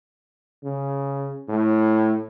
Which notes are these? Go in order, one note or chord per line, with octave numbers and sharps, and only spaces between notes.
C#3
A2